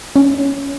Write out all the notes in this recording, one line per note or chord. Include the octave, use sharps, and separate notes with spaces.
C#4